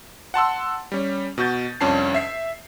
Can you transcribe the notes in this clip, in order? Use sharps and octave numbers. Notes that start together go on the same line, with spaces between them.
F#5 A5 C6 E6
G3 C#4
B2 F#4 G6 A6
C2 F2 C#4 D4 A5 C7
E5 C7